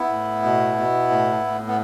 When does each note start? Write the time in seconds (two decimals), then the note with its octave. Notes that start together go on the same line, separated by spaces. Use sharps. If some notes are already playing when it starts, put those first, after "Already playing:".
Already playing: B3 E4
0.11 A2
0.44 B2
0.77 B2
1.10 A2
1.44 A2
1.67 B3